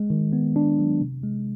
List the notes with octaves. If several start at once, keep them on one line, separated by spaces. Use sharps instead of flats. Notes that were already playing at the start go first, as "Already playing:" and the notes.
Already playing: G#3
D#3
B3
D4
F#3
C3
G#3